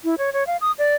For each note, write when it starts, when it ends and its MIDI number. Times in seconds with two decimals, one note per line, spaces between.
0.04 0.15 64
0.18 0.33 73
0.33 0.46 73
0.47 0.57 77
0.61 0.72 87
0.79 0.95 74